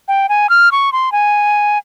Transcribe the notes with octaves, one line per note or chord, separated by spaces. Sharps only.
G5
G#5
F6
C#6
C6
G#5